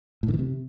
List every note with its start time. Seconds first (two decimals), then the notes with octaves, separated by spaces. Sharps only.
0.23 A2
0.28 D3
0.34 E3
0.39 C3